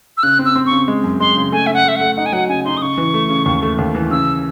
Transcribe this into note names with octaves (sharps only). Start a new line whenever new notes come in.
E6
C#3 F#6
C4
E6
C4
C#6
C#3
G#3
F#2
G#3 C6
C#3
A3 G#5
C#3 E5
F#5
A3 E5
F#5
A3
D#4 F#5
G#5
F#3 F#5
C#3 G#5
D#4 C6
D#6
C#3 C#6
E3
A3
C#3
D#2
A3
D#2
E3
C#3 E6